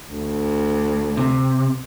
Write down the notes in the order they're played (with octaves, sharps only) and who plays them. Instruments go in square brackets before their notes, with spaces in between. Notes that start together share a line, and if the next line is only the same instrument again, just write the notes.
[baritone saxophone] D2
[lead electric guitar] C3